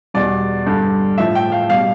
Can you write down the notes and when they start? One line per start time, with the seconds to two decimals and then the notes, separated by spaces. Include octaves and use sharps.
0.14 E2 B2 G3 D5
0.66 G2 D3 G3
1.18 A2 F3 E5
1.35 G5
1.52 F5
1.70 B2 G3 F5